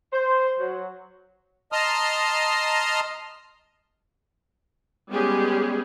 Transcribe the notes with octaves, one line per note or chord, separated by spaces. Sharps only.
C5
F#3
D#5 A5 A#5 C6 D#6 F6
G3 G#3 B3 C#4 G4 G#4